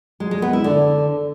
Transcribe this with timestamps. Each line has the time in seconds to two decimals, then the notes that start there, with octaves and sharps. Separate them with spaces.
0.20 G#3
0.31 G#3
0.42 B3
0.53 E4
0.64 D3